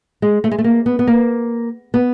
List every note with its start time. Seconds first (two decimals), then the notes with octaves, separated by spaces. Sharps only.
0.22 G#3
0.44 A3
0.51 G#3
0.58 A3
0.64 A#3
0.86 B3
0.99 B3
1.07 A#3
1.94 B3